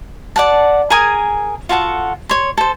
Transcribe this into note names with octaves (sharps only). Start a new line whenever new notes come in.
D5 F#5 A5
G#4 A#4 G#5 D#6
F4 F#4 A4 F#5
C#5 C6
A4 C5